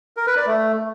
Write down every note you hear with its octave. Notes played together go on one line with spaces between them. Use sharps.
A#4
B4
D5
A3